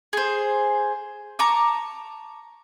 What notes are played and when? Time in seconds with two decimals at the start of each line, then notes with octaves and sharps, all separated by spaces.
0.13 G#4 C5
1.39 A5 A#5 C#6 D6